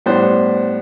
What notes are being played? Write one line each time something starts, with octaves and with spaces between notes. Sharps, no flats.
A2 G3 B3 D4 C5